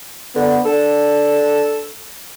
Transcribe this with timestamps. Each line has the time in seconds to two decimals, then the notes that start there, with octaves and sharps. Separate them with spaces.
0.36 D3 B3
0.66 D4 A4